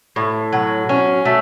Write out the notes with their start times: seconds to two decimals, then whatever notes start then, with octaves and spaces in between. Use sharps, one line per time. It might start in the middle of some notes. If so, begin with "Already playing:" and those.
0.16 A2
0.53 F#3
0.89 C#4
1.25 A3